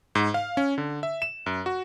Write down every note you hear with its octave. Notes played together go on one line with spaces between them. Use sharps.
G#2
F5
C#4
D3
E5
E7
F#2
F#4